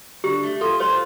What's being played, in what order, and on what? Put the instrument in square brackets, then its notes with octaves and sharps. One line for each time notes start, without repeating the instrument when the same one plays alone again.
[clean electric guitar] D3 [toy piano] G4
[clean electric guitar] A3
[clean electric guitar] F4 [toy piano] A4
[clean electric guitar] F4 [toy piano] C5